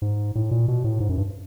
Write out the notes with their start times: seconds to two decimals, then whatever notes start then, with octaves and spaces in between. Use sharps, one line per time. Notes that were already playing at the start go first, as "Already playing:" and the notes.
0.02 G#2
0.35 A2
0.51 A#2
0.68 B2
0.84 A2
1.00 G#2
1.09 F#2
1.18 G2